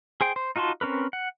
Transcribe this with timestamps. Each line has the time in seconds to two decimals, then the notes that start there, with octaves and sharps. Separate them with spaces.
0.21 G#4 C5 G5
0.36 C5
0.56 D#4 F4 F#4 A5 C6
0.81 C4 C#4 A#4 B4
1.13 F#5